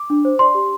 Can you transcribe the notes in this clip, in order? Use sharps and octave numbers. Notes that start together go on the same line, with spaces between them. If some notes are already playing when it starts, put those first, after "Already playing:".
Already playing: D6
D4
C5
D5 C6
G4